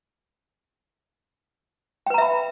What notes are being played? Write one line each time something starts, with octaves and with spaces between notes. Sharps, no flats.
B4 E5 G5 A#5 B5